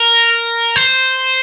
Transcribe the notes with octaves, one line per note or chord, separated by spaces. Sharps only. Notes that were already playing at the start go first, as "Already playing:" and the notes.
Already playing: A#4
C5